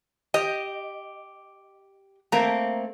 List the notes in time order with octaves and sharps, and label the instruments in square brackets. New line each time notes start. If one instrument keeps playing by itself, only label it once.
[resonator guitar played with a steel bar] G4 [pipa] D#5
[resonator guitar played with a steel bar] A3 A#3 C4 [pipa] A#5